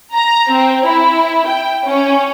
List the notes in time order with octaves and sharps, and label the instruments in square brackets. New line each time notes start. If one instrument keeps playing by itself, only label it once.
[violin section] A#5
C4
E4
G5
C#4